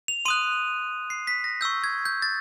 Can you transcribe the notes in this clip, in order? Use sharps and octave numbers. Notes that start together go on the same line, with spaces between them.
F7
C6 D#6 F#6 D#7
C7
B6
A#6
C#6 E6 G6
G#6
G6
A6